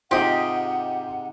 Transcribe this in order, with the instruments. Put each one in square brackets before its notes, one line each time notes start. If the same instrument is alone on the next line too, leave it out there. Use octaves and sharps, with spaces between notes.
[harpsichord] G#2 C3 [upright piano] F4 C5 [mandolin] G4 D#5 [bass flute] F#5